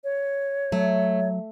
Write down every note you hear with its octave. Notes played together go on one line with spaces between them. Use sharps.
C#5
F#3 A3